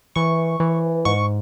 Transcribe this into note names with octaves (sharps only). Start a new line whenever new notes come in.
E3 C#6
E3
G#2 C#6